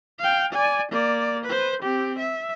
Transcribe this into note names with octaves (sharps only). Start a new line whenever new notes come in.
F5 G5
D5 G#5
A#3 D5
B4 C5
C4 G4
E5